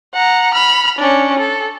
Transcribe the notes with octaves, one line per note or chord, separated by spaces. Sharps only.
F#5 A#5
B5 F6
C#4 D4
A4